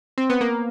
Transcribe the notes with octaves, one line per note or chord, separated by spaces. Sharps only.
C4
B3
A#3